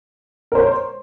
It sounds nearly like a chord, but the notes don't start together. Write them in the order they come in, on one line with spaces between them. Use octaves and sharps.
A#4 C5 C#5